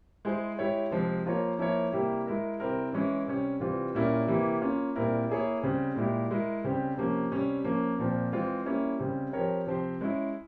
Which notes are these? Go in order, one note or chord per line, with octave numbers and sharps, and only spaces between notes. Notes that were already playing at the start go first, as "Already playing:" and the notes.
G#3 E4 G#4 C5
G#3 E4 G4 C#5
C3 F3 G#3
F3 A#3 F4 A#4 C#5
F3 A#3 E4 A#4 C#5
C3 G3 A#3 E4 G4
G#3 E4 A#4
C3 G3 C4 E4 A#4
E3 G#3 C#4 E4
C3 G3 C#4
C3 E3 G3 C4 F4
A#2 G3 C#4 E4 A#4
C3 E3 A#3 E4 G4
A#3 C#4 F4
A#2 G3 C4 E4 A#4
A#3 E4 G#4 C#5
C#3 G3 C4
A#2 G#3 E4 G4
G#3 E4 A#4
C#3 G3 C4 G4
C3 F3 A#3 C#4
C3 G3 C#4
F3 A#3 C#4
A#2 F3 C4
E3 G#3 C4 F4
G3 A#3 C#4 E4
C#3 G3 C4
F3 C4 G4 A#4 C#5
C3 F3 C4 G4 C5
G#3 C#4 E4